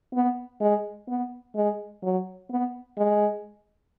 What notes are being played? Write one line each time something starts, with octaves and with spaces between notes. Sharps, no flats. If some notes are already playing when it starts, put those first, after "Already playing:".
B3
G#3
B3
G#3
F#3
B3
G#3